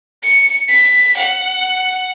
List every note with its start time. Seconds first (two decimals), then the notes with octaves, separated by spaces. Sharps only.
0.23 C#7
0.69 B6
1.17 F#5